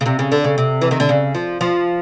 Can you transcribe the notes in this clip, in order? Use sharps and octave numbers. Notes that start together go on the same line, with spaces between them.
C#3
C3
C#3
D3
C#3
C3
E3
D#3
D3
C#3
F3
F3